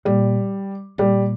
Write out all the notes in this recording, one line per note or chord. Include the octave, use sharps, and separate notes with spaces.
A#2 G3
A#2 G3